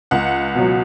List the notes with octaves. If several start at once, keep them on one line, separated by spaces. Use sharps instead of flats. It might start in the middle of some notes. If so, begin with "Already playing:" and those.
C#2 F#5
B2 F#3